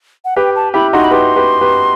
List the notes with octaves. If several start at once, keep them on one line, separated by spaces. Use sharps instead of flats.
F#5
G4 B4 G5
A5
E4 G4 B5
D#4 F#4 C6
B5
G4 B4 C6
G4 B4
G4 B4